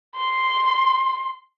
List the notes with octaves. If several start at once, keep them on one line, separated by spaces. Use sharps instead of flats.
C6